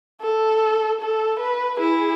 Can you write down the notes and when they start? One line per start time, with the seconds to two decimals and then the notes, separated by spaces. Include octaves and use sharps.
0.22 A4
1.01 A4
1.40 B4
1.80 E4 G#4